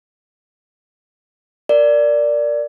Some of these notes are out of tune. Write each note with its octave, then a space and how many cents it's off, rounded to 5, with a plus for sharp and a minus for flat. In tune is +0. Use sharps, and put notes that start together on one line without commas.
A#4 +0 D5 +0